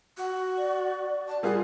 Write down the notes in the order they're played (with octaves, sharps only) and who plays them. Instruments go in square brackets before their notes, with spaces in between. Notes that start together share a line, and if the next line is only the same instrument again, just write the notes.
[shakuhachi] F#4
[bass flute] D5
[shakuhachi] A5
[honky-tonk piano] G3 F4 G#4 [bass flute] A#4 [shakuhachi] F#5